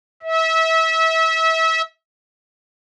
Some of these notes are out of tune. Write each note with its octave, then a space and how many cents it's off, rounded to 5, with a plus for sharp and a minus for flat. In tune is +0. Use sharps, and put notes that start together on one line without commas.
E5 -30